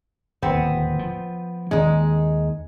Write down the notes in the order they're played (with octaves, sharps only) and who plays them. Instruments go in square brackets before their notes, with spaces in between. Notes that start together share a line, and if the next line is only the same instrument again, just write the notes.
[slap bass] D1 D#2 [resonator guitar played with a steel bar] B3 C4
[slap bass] F3
[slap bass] D#2 D#3 C#4 [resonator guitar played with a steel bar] G#3 D#4